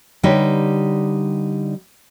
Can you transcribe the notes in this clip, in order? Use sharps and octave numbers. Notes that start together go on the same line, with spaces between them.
D3 G3 D#4 G4 B4 C#5